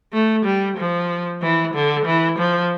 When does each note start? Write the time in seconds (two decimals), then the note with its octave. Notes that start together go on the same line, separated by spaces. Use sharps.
0.13 A3
0.45 G3
0.78 F3
1.42 E3
1.74 D3
2.06 E3
2.39 F3